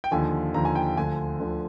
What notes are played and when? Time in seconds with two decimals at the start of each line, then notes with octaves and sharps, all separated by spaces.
0.04 G5
0.11 D#2 D3 F3 G#5
0.54 D#2 D3 F3 A#5
0.65 G#5
0.75 G5
0.97 D2 D3 F3 G#5
1.40 D2 D3 F3